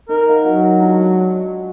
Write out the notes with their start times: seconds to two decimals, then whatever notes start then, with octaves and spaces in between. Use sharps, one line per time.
0.09 D#4 A#4
0.29 F5 F#5
0.45 F#3 F#4
0.80 G#3 D4 F4